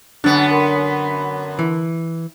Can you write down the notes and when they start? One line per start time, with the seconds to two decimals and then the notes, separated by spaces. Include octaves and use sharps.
0.24 F#2 D3 B3 F#6 A6
0.51 A#4 B5 C6
1.59 E3